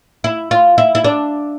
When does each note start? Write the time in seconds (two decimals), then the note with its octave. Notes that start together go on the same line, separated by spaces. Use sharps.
0.24 E4
0.51 F4
0.78 E4
0.95 E4
1.04 D4